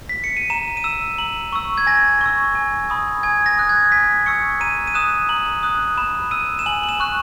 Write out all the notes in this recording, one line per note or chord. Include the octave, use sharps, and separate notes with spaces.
B6
C#7
D#7
A#5 E7
D#7
E6 E7
A#5 F#7
C#6 E6
G#6
G#5 A#6
C#6 E6
G#5
B5 D#6
G#5 G#6
A#6
D#6 F#6
G#6
G#5 B6
C#6 E6 C#7
A#5 D#7
D#7
D#6 F#6 E7
A#5 F#7
D#6 F#6
B5 E7
E6 D#7
E7
G#5 F#7
F#7
E7
C#6 F#6